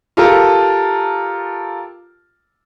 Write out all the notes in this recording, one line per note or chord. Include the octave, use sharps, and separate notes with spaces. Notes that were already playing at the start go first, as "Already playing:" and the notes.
F4 G4 A4 A#4 A5